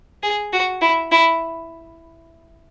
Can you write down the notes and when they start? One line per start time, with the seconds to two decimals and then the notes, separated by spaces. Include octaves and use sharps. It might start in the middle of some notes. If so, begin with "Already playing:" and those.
0.23 G#4
0.53 F#4
0.82 E4
1.11 E4